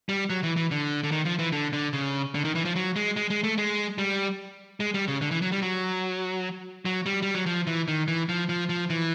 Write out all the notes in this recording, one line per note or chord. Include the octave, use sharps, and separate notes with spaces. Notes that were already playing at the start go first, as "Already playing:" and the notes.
G3
F#3
E3
E3
D3
D3
D#3
F3
E3
D3
D3
C#3
D3
D#3
E3
F3
F#3
G#3
G#3
G#3
A3
G#3
G3
G#3
G3
C#3
D3
E3
F#3
G3
F#3
F#3
G3
G3
F#3
F3
E3
D#3
E3
F3
F3
F3
E3